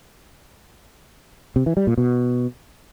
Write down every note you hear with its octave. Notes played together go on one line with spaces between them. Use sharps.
C3
E3
G3
A#2
B2